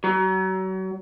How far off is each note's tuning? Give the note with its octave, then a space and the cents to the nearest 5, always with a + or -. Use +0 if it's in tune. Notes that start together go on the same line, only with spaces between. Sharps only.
F#3 +35